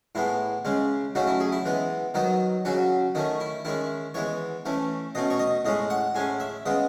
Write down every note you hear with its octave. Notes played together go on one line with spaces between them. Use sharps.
A2 G#3 B3 E4
C#3 G#3 C#4
C#3 F#3 A3 C#4 D#4
E4
G#4
E4
E3 G#3 B3
D#3 F#3 B3 D#4
C#3 F#3 C#4 F#4
D#3 A3 C#4 D#4
E4
D#3 G#3 C#4 E4
E3 G#3 B3 C#5
E3 A3 C#4
B2 A3 C#4 D#5
C#5
D#5
A2 G#3 C#4 D#5
F#5
A2 G#3 C#4 G#5
E5
C#3 G#3 B3 D#5